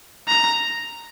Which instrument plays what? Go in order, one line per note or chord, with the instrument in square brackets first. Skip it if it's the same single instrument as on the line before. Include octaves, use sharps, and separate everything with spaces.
[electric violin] A#5